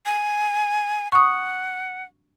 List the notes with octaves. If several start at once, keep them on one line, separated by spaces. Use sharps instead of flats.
G#5
F#5 C#6 D#6